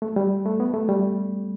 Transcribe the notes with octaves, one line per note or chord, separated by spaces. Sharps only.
A3
G3
A3
B3
A3
G3